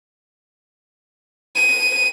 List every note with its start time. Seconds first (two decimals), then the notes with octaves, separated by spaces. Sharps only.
1.55 D#7